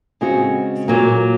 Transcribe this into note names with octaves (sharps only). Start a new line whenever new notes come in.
C#3 G#3 C4 F#4
A#2 F#3 A#3